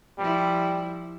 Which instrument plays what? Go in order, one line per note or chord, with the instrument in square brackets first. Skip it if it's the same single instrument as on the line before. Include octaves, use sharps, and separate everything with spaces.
[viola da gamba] F3 E4 [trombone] G3